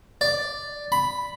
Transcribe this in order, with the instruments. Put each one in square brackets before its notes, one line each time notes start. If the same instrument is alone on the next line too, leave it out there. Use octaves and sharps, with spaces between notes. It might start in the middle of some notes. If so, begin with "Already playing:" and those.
[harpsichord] D5
B5